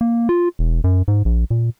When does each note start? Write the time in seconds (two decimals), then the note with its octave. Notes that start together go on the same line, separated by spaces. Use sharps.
0.01 A#3
0.29 F4
0.59 E1
0.84 F#2
1.08 G#2
1.25 A#1
1.50 A#2